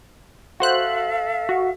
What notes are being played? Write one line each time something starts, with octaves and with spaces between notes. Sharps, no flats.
F#4 A4 C5 E5 F5 F#6
F#4